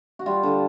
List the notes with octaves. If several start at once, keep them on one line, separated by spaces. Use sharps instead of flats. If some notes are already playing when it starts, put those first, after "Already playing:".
F#4
G3 F4
D3